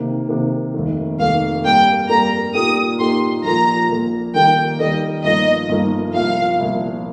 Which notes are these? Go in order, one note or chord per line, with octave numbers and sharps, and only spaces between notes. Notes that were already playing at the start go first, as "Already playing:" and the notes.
Already playing: C3 D#3 A#3
C3 D#3 A#3
F1 D#2 D#3
F1 D#2 D#3 F5
G2 G3 A#3 G5
G2 G3 A#3 A#5
A#2 A#3 D#4 G4 A#4 D#6
A#2 A#3 D#4 G4 A#4 C6
A#1 A#2 F3 A#3 A#5
A#1 A#2 F3 A#3
D#2 D#3 G3 A#3 D#4 G5
D#2 D#3 G3 A#3 D#4 D#5
G1 G2 F3 A#3 D#4 D#5
G1 G2 F3 A#3 D#4
C2 A#2 F3 F5
C2 A#2 F3